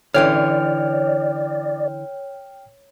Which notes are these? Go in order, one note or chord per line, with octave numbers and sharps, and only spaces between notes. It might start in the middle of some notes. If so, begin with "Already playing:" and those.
D3 E3 C#4 C#5 D5 G5 F6